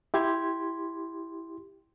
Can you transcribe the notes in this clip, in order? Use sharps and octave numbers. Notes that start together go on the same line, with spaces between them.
E4 G4 C6 G#6